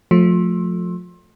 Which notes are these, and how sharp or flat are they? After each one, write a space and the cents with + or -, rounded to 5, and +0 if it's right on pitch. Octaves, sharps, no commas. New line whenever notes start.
F3 +30 A3 +0